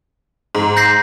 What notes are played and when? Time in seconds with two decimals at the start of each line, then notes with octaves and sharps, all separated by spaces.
0.55 G#2
0.77 G6 A#6 C7